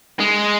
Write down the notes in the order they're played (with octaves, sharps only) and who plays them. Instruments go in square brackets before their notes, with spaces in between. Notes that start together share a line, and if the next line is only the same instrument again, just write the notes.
[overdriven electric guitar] G#3